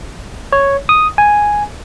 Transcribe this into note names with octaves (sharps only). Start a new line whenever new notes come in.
C#5
D#6
G#5